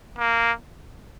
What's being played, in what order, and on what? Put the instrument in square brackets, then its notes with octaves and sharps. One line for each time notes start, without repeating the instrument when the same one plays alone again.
[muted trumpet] A#3